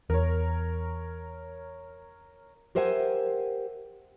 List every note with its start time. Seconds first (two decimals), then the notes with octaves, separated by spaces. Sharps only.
0.10 E2 A#4 C#5
2.75 G4 A#4 C5 E5 F#5 G#5